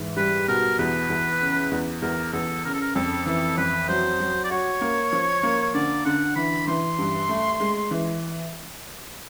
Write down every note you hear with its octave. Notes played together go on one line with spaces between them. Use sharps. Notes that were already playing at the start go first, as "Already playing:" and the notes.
Already playing: G#2 E3
G3 B4
B2 A#4
E2 B4
E2
C#3
E2
E2 A#4
E2 A4
C#3 A#4
A4
A#4
F2 A4
E3 A4
F2 B4
F#3 C5
F#3
D5
F#4 C#5
A#3
F3
A#3
C#5
D3 D5
D3 F#5
E3 B5
E3 C6
G2
A3
G#3
E3